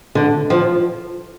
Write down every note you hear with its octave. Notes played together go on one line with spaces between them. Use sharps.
D3
F3